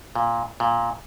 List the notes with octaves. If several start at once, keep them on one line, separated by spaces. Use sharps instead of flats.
A#2
A#2